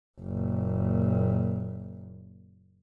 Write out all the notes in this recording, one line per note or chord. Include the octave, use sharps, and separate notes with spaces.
F#1 A#2